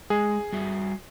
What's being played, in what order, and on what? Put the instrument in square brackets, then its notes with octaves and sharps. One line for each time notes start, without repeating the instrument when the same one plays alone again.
[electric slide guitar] G#3 [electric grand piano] G#4
[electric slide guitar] G3 F#4 E5